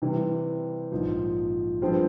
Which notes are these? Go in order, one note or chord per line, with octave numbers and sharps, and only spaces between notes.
C3 E3 G3
A#1 G#2 F3
G2 F3 G#3 C4